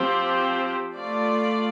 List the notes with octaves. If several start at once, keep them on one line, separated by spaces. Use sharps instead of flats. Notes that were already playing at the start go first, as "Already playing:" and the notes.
Already playing: F3 C4 G4 C5
A3 F4 D5